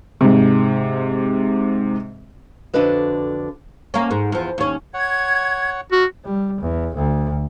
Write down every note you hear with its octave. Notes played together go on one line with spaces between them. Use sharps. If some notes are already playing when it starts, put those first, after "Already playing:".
G#2 C3
F2 D3 D4 F#4 B4 D#5
A#3 C#4
G#2
E2 F3
D#2 C#4
C#5 F#5 G#6
F2 F#4 F6
G3
E2
D2